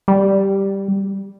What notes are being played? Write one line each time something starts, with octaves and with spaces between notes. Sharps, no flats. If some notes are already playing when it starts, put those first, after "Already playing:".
G3